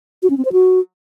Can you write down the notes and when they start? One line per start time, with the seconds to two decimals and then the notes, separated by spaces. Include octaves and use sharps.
0.23 F#4
0.30 C#4
0.38 C4
0.45 C5
0.52 F#4